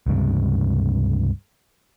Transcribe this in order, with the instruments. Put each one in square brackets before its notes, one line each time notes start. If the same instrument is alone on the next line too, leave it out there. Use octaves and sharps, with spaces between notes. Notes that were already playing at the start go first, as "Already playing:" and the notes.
[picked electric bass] C#2 G2 C3